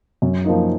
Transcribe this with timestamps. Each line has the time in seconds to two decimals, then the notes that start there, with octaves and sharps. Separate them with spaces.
0.22 F#2
0.44 F3 A#3 D#4